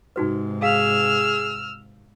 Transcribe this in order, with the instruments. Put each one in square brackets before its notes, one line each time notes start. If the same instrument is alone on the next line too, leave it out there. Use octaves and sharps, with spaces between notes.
[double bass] G#2 C3 [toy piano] D#4 F#4 B4
[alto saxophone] G#4 [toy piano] F5 [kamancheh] E6 F6